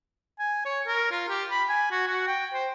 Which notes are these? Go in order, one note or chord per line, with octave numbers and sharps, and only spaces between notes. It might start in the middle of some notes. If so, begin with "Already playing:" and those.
G#5
C#5
A#4
F4
G4
B5
G#5
F#4
F#4
G5
C5